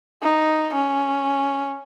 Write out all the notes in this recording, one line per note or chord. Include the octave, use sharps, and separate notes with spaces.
D#4
C#4